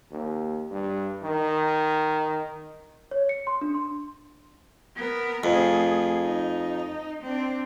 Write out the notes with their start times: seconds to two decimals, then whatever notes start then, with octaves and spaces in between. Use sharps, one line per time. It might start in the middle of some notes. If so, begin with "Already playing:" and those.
0.11 D#2
0.71 G2
1.23 D#3
3.11 C#5
3.29 C#7
3.47 C6
3.61 D4
3.75 C6
4.97 B3 A#4
5.44 F2 A3 G#4
6.24 D#4
7.21 C4 D4